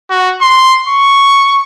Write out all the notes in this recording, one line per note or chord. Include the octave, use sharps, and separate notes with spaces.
F#4
C6
C#6